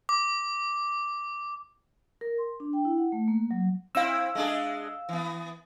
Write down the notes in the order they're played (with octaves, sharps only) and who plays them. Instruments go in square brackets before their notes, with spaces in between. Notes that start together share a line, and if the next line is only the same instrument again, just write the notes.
[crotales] D6
[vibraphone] A#4
C6
D4
G5
E4
F#5
A3
A#3
F#3
[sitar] C4 E4 [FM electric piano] F5 E6
[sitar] G#3 D4 G#4
E3 B3